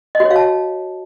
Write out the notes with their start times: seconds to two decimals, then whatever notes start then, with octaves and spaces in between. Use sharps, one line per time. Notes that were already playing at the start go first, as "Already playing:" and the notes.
0.15 D#5
0.20 F#4
0.25 C#5
0.30 F5
0.36 A5